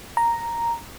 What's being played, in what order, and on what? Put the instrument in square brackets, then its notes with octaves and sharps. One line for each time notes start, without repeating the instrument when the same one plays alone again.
[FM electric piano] A#5